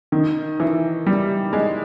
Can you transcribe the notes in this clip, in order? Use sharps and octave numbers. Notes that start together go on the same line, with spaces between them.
D#3
E3
G3
G#3